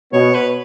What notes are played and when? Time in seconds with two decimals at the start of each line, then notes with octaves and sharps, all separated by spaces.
0.13 B2 B3 C#5
0.34 B4